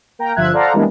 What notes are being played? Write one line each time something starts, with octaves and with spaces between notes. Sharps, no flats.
A#3 A#4 G5 A#5
G1 F3 F4 E5 F#6 G#6
A4 C5 D5 F5 F#5 A#5
E3 G3 G#3 A#3 B3 D4